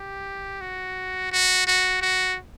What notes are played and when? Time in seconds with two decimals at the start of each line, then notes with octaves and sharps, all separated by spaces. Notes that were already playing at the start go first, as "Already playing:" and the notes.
Already playing: G4
0.61 F#4
1.32 F#4
1.67 F#4
2.01 F#4